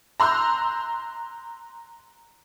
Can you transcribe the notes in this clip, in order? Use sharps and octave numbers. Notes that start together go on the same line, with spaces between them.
A#5 C6 E6 F#6 G6